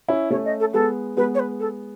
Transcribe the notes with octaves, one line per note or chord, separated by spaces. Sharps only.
C#4 E4
A3 C#4 C#5
D#5
A4
G#3 B3 A4
G#3 B3 B4
C#5
B4
A4